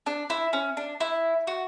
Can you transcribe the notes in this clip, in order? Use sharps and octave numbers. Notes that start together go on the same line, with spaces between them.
D4
E4
C#4
D4
E4
F#4